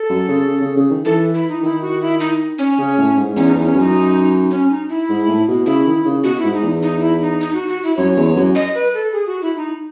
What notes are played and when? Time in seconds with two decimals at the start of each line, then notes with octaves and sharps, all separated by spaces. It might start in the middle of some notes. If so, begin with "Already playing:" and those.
Already playing: A4
0.09 F#2
0.28 C#3
0.47 C#3
0.62 C#3
0.77 C#3
0.91 D#3
1.05 E3 A4
1.35 E4
1.49 D#4
1.63 D#3 E4
1.82 F#4
2.01 E4
2.20 D#4
2.58 C#4
2.78 C#3
2.98 A2
3.17 G#2
3.36 E2 C#4
3.50 D#4
3.56 E2
3.65 C#4
3.74 F#2
3.79 D#4
4.51 C#4
4.70 D#4
4.89 E4
5.09 G#2
5.28 A2
5.48 B2
5.66 C#3 E4
5.86 D#3
6.05 C#3
6.24 B2 F#4
6.38 E4
6.43 G#2
6.54 D#4
6.63 E2
6.83 D#4
7.01 E4
7.21 D#4
7.40 D#4
7.54 F#4
7.68 F#4
7.83 E4
7.97 F#2 C#5
8.16 E2
8.36 F#2
8.55 D#5
8.75 B4
8.94 A4
9.13 G#4
9.26 F#4
9.42 E4
9.56 D#4